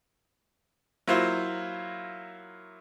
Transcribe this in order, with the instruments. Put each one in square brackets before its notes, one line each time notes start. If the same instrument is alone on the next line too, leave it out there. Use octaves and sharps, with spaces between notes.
[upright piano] F#3 A#3 E4 F4 C5